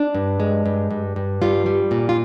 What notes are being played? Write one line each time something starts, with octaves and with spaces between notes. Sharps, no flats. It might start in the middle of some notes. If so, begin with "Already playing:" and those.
Already playing: D4
G2
G#3
G2
G2
G2
G3 F4
G3
A#2
F4